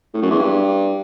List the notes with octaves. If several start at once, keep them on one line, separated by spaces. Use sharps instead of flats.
A2
F#2
E2
G2